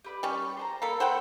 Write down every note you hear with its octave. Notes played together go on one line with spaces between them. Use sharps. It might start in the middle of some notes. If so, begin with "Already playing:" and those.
G4 B4 D5
G3 C#4
C5 A5 A#5
A#3 A4 A#5 B5
A4 C5 F#5 G5 B5 E6